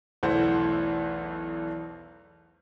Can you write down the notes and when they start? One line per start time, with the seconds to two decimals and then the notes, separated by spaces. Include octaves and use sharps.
0.23 B1 E2 E3 A3 C5 F#5